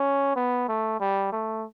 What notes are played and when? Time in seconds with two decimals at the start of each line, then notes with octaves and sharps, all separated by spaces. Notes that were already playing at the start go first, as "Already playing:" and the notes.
Already playing: C#4
0.36 B3
0.68 A3
1.00 G3
1.32 A3